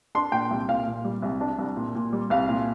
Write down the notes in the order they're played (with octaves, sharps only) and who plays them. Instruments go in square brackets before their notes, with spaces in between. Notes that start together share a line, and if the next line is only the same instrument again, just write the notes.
[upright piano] D4 C6
A#2 G5
C2
A#2 F5
A#2
G3
C2
D4
C2
A#2
A#2
G3
C2 F5
A#2